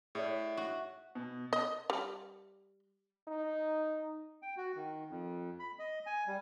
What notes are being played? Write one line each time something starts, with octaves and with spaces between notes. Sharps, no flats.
A2 G#4 C#5 D5 E5
F#4
B2
D#5
G3
D#4
G5
F#4
D#3
F2
B5
D#5
G#5
G3